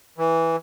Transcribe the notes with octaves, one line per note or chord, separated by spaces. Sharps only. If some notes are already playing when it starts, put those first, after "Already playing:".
E3